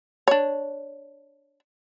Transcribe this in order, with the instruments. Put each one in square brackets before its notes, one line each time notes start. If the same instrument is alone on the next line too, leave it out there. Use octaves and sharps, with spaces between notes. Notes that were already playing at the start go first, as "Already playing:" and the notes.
[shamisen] D4 C#5